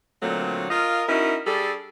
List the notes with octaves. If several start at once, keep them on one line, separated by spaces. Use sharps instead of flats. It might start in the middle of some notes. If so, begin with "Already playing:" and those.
A#2 D3 F#3 A3 C4
F4 A#4 D#5 F5
C#4 D#4 E4 F#4 A#4
G3 D4 G#4 A4